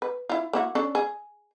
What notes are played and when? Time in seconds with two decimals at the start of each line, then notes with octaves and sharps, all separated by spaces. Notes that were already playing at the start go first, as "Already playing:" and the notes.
0.02 B4
0.29 E4 F4
0.53 A#3 E4 F#4
0.75 C#4 D4 A4
0.95 G#4